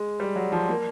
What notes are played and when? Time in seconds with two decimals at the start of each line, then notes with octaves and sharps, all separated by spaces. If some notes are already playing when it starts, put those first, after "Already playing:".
Already playing: G#3
0.20 G3
0.36 F#3
0.52 F3
0.69 A#3